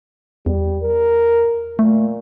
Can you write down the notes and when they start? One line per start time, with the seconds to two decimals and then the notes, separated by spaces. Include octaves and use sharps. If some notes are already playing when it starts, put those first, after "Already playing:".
0.46 E2 G3
0.83 A#4
1.79 A#2 A3